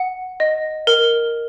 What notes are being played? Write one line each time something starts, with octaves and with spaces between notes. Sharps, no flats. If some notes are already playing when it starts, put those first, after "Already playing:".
Already playing: F#5
D#5
A#4